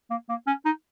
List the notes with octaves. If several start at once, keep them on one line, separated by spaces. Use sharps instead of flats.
A#3
A#3
C#4
D#4